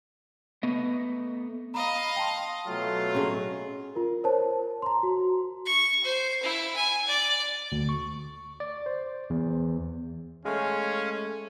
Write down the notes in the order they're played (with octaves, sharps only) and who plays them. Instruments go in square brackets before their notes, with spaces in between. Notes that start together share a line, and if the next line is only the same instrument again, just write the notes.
[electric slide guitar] A3 B3 D#5
[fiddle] D#5 F5 [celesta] A#5 B5
[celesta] G5 A5 C6
[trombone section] B2 F#3 A3 [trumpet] F4
[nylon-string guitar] C#4 G#4
[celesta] F4 A#4
A#4 C5 C#5 A5
A#5 C6
F#4
[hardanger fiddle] C#6
C5
E4
G#5
D5
[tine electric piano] D2
C#6
D5
C5
E2
[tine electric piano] G#3 A3 [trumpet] C#4 [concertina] C#5 F5 G#5